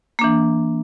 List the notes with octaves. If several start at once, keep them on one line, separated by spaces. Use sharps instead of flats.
E3 A#3 D4